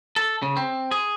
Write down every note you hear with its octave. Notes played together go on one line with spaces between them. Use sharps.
A4
C#3
C4
G#4